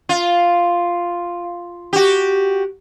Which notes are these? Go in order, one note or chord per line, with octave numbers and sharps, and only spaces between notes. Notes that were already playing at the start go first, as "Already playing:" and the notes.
F4
F#4 G4